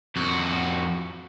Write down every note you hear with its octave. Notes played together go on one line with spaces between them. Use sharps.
F2 F#4